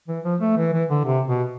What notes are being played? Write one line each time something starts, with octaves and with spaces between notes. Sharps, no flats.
E3
F3
A3
E3
E3
D3
C3
B2